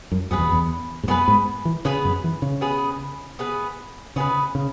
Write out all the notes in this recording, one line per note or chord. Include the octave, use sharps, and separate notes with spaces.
F#2
F#2 B3 G#4 B4
E2
E2
G#2
F#2 B3 G#4 B4
G#2
E3
C#3 B3 G#4 B4
F#2
E3
C#3
B3 G#4 B4
B3 G#4 B4
C#3 B3 G#4 B4
C#3